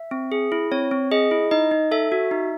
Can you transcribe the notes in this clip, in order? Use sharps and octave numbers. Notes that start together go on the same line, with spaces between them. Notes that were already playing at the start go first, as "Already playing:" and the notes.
Already playing: E5
C4
G#4
E4
C4 C#5
C4
G#4 D#5
E4
D#4 D#5
D#4
A4 E5
F#4
D#4